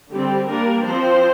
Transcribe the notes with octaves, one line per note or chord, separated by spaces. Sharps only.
D3 G3 C4 G4
G3 A#3 D4 A#4
F3 C4 C5